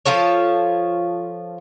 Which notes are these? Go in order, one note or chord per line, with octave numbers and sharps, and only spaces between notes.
F3 F4 A4 C#5